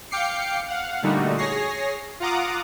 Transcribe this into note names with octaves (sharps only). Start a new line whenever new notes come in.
F5 G5 D6 C7 C#7
F5 F#5
A#2 D3 G3 A3 D#4 F#4
G#4 C#5 A#6 C7
F4 F5 F#5 A#5 D6 D#6